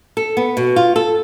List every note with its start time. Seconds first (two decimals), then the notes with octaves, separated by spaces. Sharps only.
0.17 A4
0.37 B3
0.57 B2
0.76 F4
0.96 A4